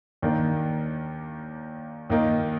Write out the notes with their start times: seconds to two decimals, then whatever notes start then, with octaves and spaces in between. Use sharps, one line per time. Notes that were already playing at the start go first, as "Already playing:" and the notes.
0.22 D#2 D#3 A#3 D4
2.10 D#2 D#3 A#3 D#4